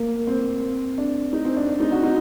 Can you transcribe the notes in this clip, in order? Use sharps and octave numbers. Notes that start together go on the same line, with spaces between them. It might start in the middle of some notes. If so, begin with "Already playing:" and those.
Already playing: A#3
C4
D4
D#4
C4
D4
D4
D#4
F#4
D#4